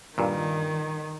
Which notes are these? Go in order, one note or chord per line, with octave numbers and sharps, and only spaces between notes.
G2 A#2 D#3